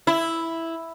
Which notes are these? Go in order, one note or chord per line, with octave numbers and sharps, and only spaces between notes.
E4